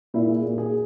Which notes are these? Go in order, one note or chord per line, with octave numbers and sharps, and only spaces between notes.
A#2 E4
G#4
A#2
G#4